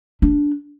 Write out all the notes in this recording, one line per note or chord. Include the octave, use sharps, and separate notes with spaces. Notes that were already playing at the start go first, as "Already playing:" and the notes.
D4